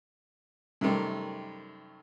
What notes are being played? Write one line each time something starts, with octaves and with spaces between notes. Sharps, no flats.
F#2 C3 D#3 G3 A3